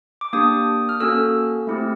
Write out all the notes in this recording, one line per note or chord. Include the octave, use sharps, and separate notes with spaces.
D6
A#3 D4 G4 D#6
F6
A#3 C#4 F#4 A4 E6
A3 C4 E4 G4